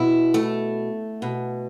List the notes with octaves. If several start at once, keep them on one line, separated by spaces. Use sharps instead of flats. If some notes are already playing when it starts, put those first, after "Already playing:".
Already playing: B2 E4
A3
B2